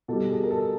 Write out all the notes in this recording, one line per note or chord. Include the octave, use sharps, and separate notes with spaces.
B2 G3 A4
G#4
A#4
A4